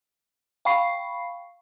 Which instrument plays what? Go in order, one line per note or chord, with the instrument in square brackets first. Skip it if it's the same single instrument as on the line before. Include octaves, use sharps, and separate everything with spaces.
[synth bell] F5 G5 B5 C#6 C7